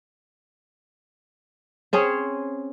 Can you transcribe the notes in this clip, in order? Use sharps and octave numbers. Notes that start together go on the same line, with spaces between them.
C4 C#4 G#4 C#5